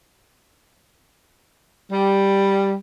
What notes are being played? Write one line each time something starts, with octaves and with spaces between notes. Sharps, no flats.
G3